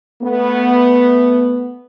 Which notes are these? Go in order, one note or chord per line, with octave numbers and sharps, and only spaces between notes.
A3 B3